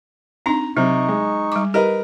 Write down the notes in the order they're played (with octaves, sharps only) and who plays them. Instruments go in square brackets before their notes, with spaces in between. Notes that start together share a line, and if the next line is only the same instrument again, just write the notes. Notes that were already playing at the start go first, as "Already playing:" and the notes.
[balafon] C4 D4 D#4 [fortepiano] A#5
[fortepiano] C3 [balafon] F#3 [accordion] D#4 C#6
[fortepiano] G#3
[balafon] G3 D6
[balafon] G4 [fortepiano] A#4 B4 D#5